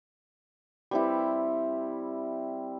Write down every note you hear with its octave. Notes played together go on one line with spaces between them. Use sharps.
G3 C4 E4